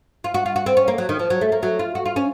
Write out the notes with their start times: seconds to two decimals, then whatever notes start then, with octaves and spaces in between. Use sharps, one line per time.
0.24 F4
0.34 F#4
0.46 F4
0.56 F#4
0.66 C4
0.77 C#4
0.88 A#3
0.98 F#3
1.09 D#3
1.19 F3
1.30 F#3
1.41 A3
1.52 A#3
1.63 F#3
1.79 F4
1.95 F#4
2.06 F4
2.16 C#4